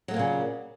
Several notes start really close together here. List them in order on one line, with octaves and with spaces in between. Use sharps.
F#3 A3 A#3 A#2 C#3